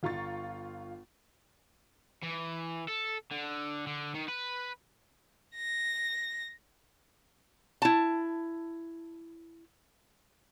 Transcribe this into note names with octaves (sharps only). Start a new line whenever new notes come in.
G1 F4 A#5 C#6 A6
E3
A4
D3
D3
D#3
B4
A#6
E4 A5